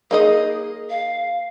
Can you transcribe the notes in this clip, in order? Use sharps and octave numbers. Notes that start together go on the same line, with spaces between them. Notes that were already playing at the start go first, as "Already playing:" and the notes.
A#3 D#4 G#4 D#5
F5